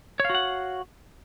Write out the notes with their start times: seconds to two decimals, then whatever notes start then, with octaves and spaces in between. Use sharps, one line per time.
0.20 C#5
0.25 F5
0.30 F#4
0.35 F#5